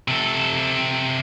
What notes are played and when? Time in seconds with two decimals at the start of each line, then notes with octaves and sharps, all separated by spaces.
0.08 C3 A4